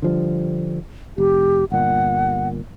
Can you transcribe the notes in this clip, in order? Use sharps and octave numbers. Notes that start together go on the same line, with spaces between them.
D3 F3 G3
F1 G4
G1 A#2 F#5